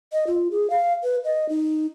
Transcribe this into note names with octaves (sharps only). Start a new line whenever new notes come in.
D#5
F4
G#4
F5
B4
D#5
D#4